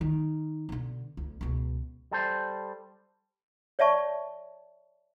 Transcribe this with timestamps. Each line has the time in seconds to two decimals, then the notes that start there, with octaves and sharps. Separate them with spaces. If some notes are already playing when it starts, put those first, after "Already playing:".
0.01 D#3
0.69 B2 D3
1.17 D2
1.41 C#2 B2
2.12 G3 A4 C5
3.79 C#5 D5 E5 A5 C#6